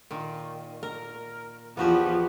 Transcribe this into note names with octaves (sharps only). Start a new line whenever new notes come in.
A#2 D#3
A#4
E2 F3 B3 F#4 G4